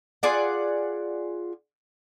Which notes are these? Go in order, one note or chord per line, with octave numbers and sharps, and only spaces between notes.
F4 G#4 D5 F#5